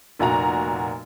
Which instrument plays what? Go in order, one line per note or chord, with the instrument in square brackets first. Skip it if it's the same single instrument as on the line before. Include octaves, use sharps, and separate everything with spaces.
[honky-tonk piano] F1 A#2 F#4 A#5